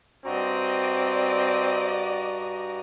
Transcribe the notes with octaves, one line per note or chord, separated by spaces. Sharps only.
G2 C4 F#4 D5 D#5 A#5